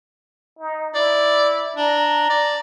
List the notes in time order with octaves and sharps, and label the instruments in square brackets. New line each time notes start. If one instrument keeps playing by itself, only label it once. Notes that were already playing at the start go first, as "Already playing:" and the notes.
[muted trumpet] D#4
[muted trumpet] E4 [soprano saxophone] D5
[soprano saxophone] D4 [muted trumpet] A#5
[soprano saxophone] D5